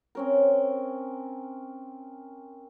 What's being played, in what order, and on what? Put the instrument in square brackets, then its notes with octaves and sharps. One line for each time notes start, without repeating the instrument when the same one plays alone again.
[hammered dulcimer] C4 C#4 A#4